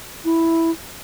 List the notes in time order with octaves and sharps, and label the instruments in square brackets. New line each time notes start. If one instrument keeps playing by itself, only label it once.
[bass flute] E4